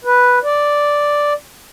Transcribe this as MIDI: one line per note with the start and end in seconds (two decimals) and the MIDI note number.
0.05 0.39 71
0.44 1.33 74